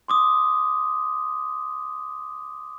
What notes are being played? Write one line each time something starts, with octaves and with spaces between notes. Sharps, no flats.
C6 D6 D#6